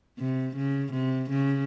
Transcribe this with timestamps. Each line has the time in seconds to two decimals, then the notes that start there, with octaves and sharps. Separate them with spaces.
0.19 C3
0.56 C#3
0.92 C3
1.30 C#3